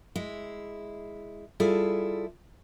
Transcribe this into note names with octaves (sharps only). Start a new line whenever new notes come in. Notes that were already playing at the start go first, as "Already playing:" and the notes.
G#3 E4
G3 E4 F4 G#4 A4